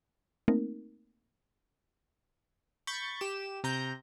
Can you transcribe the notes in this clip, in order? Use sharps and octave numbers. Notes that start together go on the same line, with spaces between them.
A3 A#3 C4 D#4 A#4
B5 C#6 G6 A6
G4 E7
C3 A#5 G6